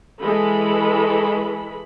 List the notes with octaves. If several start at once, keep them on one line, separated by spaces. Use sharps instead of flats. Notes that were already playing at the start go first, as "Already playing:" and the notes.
E3 G#3 A4 B5